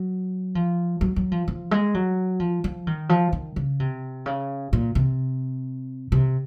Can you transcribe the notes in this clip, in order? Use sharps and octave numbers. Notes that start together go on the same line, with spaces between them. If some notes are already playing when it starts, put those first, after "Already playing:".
Already playing: F#3
F3
F#3
F#3
F3
F3
G#3
F#3
F3
F3
D#3
F3
D#3
C#3
C3
C#3
A#2
C3
C3